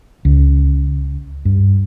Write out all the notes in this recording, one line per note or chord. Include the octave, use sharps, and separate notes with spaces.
C#2
G2